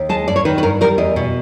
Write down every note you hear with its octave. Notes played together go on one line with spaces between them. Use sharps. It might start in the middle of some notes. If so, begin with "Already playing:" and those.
Already playing: D#2
G#3 A5
G2 D5
C#5
D#3 B4
B4
G2 A#4
G3 A#4
E2 D#5
B2